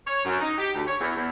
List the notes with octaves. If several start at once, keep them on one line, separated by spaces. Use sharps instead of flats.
C#5
F#2
D#4
G4
D2
C#5
E2
E2